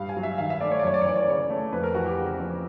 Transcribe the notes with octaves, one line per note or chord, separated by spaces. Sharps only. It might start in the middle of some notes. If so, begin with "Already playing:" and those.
Already playing: G2 F5
G#5
F#3
E5
D#3 F5
E5
A3 D5
C#5
D5
F#2 C#5
D5
C#5
E3 D5
C#5
D5
C#3 C#5
A3
F2 B4
A#4
E3 F#4
G4
C#3
F2